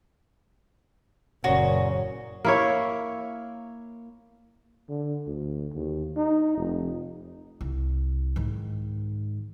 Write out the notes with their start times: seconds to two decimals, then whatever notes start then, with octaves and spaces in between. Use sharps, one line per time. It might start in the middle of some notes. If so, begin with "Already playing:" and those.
1.44 F#1 A#2 C#3 F#4
2.45 A#3 E4 C#5
4.89 D3
5.27 D2
5.74 D#2
6.17 D#4
6.57 F1
7.61 C2
8.36 G#2 D#3